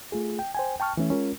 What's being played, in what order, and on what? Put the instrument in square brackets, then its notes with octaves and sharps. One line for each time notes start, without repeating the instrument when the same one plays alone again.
[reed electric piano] A3 F4 G#4
G5
C5 G5 G#5
G5 A5 C#6 F6
E3 A3 C#4 E4
G#3 C#4 F4 A#4